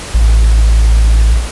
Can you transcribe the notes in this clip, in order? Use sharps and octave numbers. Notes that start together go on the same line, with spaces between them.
A1